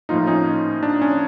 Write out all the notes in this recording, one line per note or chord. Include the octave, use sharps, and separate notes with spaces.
A2 F3 A#3 D#4 F4
C#4 D#4
D4
C#4